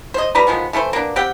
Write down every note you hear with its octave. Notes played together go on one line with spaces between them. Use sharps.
C5 D#5
G3 B4 D5 A#5
D#3 F3 G#3 B3
E3 A3 E4 C5
A#3 B3 D4
C4 G4 F#5 G5